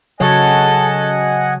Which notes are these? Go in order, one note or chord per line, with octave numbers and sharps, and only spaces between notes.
C#3 F#3 A4 C#5 D#5 F#5 G#5